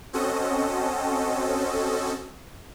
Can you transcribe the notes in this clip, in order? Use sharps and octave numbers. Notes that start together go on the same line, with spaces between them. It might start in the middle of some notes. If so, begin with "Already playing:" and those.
C4 C#4 F#4 A4 D#5